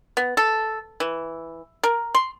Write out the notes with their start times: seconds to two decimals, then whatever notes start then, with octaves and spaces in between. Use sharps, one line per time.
0.17 B3
0.37 A4
1.00 E3
1.83 A#4
2.15 C6